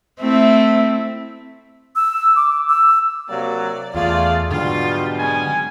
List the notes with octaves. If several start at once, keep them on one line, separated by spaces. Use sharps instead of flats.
A3 C4 E4
E6
D6
E6
C3 F#3 A#3 D5
E2 A3 F4 G#4 D5
G#2 B2 D3 F#3 G3 F4
G#3 C#4 G#5